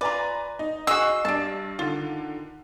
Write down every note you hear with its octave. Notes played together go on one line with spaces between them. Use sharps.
F4 B4 D5 G#5 A#5
D#4
F#4 G#4 D#5 E6 C7
G2 D4 A5
D3 D#3 F4